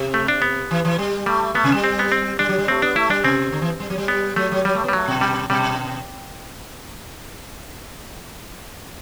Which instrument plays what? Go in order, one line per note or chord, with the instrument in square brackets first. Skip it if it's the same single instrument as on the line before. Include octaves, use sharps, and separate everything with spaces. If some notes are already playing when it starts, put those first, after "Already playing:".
Already playing: [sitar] C3
[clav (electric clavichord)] A3
D4
B3
[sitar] E3
E3
G3
[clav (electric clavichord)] G3 [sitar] A3
[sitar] A3 [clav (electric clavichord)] B3
[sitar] C3
G3
[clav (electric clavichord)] C4
B3
C4
[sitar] G3 [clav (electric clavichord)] D4
[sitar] F#3
G3
[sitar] A3 [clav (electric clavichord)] C4
[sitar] B3 [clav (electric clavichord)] D4
[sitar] A3 [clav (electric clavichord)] E4
[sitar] G3 [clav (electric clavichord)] D4
[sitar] C3 [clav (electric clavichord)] C4
[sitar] D3
E3
G3
F#3
G3
[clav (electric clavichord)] B3
[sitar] F#3 [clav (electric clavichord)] A3
[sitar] F#3
[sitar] F#3 [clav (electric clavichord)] G3
[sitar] A3
B3
[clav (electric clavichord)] G3
[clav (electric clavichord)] F#3 [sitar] A3
[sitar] B2
[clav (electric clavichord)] G3
[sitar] B2 [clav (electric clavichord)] G3